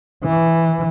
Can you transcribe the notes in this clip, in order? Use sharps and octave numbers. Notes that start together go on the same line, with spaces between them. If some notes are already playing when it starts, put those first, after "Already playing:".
E3